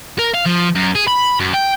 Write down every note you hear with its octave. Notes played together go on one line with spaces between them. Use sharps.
A#4
F5
F3
F#2
G#4
B5
F#2
G5